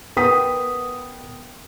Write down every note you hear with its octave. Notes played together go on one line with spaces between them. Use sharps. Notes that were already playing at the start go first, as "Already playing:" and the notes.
B3 A#4 F#5 G5 D#6 B6